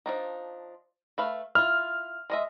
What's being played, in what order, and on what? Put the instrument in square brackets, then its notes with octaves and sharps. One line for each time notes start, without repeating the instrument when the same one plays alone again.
[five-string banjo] F3 D4 D#4
A3 B4 F5
[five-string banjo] E4 F4 [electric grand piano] F6
[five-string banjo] G#3 D#5 E5